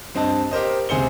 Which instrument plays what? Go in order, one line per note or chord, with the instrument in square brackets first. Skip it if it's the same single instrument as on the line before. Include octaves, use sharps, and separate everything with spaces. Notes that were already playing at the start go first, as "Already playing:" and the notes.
[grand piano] G2 C4 D#5 A5
G4 A#4 C5 D#5
C#2 C3 G#4 C5 C#7 G7